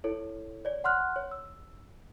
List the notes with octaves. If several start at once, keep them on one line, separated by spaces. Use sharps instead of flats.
E4 A4 C#5
C#5 D5
F#5 C6 F6 F#6
C#5
E6